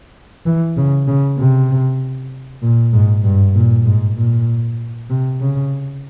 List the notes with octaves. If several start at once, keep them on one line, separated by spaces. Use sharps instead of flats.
E3
C#3
C#3
C3
A#2
G#2
G2
A#2
G#2
A#2
C3
C#3